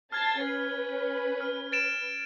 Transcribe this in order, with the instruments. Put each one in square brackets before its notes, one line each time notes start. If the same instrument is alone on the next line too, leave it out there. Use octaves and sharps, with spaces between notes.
[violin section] A5 A6 C7 [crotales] F6 G#6
[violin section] C#4 B4
[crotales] F6
A6 D7 E7